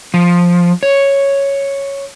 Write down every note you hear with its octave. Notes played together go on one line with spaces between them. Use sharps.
F3
C#5